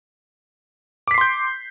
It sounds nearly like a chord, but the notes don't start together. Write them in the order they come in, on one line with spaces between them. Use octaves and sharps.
D6 B6 C7 C6 G6